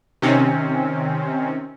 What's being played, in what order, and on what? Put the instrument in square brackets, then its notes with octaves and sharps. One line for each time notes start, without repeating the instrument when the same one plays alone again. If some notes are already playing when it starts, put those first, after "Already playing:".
[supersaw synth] C3 D#3 C4 C#4